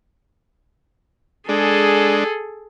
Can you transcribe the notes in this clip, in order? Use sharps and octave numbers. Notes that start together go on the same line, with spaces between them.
G#3 D4 G#4 A4